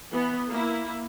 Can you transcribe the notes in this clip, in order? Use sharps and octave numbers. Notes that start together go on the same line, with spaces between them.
E3 B3
A#3 E4